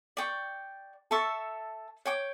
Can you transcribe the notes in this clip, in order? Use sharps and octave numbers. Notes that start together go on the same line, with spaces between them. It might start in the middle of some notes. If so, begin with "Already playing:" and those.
D5 G5 C#6
A4 E5 A5 C#6
C#5 G5 D6